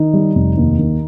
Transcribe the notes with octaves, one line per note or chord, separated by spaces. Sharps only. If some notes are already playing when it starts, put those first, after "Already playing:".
Already playing: D#3 D#4
G3
F1
D#2
D#3